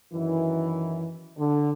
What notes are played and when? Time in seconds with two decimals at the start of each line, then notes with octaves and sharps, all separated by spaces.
0.12 F#2 D#3 E3
1.38 D3